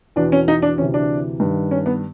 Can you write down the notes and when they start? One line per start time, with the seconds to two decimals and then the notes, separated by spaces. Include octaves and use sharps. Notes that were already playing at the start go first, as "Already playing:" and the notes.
0.16 E2 B2 D4
0.32 C#4
0.48 D#4
0.62 D4
0.78 D2 C3 E3 C#4
0.94 D4
1.40 G2 D#3
1.71 C#4
1.86 B3